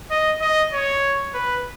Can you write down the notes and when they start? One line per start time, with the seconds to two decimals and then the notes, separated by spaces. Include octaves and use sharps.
0.11 D#5
0.41 D#5
0.73 C#5
1.34 B4